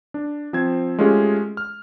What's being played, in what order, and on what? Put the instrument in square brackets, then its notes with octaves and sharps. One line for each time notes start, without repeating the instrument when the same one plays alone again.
[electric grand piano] D4
F3 C4 C5 G#6
G#3 A3 C#4 F4 G4 G#4
F6